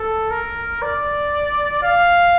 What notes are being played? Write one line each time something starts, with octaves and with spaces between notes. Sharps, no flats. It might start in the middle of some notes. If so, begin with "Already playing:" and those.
Already playing: A4
A#4
D5
F5